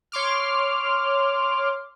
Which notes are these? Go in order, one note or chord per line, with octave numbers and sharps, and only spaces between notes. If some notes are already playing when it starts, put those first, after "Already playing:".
C#5 C6 D6 F6